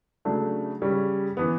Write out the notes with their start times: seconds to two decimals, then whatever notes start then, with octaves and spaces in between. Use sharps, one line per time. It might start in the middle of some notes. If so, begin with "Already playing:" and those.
0.25 C#3 F#3 A3 D4
0.82 C#3 G3 C#4
1.37 E3 B3